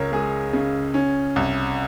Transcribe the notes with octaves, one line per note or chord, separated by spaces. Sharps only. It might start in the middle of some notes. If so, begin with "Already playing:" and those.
Already playing: C#2 A#4 C#5
G#3 G#4
C#3
C#4
C2